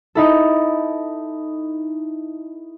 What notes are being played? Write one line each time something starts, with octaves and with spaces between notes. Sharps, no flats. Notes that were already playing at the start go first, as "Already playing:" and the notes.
D#4 E4 A4